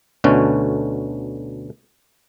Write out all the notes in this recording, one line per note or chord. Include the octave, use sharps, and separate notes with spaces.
D2 B2 D3 A3 C#4